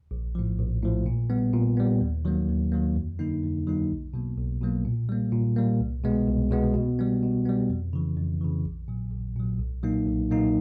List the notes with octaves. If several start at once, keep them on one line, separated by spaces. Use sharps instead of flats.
A#1
A2 F3
A#1
A2 F3
A#2
G3 B3
A#2
G3 B3
D#2
D#3 F#3 A#3
D#2
D#3 F#3 A#3
F2
D3 F#3 A#3 D#4
F2
D3 F#3 A#3 D#4
B1
B2 F#3 A#3
B1
B2 F#3 A#3
A#2
G3 A#3
A#2
G3 A#3
C2
B2 G#3 B3
C2
B2 G#3 B3
B2
G3 B3
B2
G3 B3
F2
C#3 E3
F2
C#3 E3
A#1
A#2 F#3
A#1
A#2 F#3
B1
A#2 F#3 A#3 D#4
B1
A#2 F#3 A#3 D#4